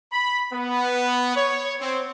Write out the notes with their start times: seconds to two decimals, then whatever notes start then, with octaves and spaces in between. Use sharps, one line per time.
0.12 B5
0.53 B3
1.35 C#5
1.81 C4